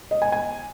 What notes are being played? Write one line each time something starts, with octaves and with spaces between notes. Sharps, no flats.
D#5
G#5
G#5